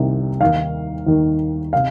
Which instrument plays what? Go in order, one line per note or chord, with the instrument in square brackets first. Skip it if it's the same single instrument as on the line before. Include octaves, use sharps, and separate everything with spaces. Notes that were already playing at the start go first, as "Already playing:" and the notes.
Already playing: [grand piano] C2 C3 D#3
D#2 D#3 F5
D#2 D#3
C3 F5